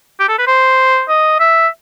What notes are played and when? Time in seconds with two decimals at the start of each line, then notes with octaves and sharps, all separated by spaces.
0.20 G4
0.29 A4
0.38 B4
0.47 C5
1.09 D#5
1.40 E5